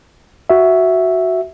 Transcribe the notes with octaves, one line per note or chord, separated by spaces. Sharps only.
F#4 E5